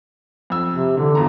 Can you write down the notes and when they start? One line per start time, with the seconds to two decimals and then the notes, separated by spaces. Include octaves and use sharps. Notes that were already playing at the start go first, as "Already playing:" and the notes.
0.50 F2 E6
0.73 C3
0.97 D3 E3
1.15 B1 E2 A#5